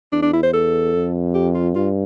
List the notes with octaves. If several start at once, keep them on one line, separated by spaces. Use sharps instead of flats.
E2 D4
D4
E4
C5
A4
F2
G4
F4
G2 F4